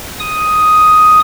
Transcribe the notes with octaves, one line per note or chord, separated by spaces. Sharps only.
D#6